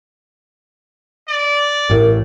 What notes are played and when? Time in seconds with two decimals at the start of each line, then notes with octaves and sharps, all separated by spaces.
1.28 D5
1.90 A1 A2 A#4